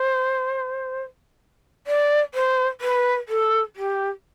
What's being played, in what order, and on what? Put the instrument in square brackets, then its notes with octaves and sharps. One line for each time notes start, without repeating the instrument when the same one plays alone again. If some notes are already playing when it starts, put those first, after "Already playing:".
Already playing: [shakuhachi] C5
D5
C5
B4
A4
G4